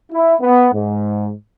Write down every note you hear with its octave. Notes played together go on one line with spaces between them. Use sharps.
E4
B3
G#2